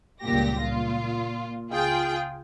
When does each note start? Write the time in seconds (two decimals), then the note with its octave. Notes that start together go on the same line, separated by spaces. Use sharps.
0.22 C#2 G2 A#2 G4 A#6
0.60 A#2 F4
1.71 C#2 F4 G#4 G5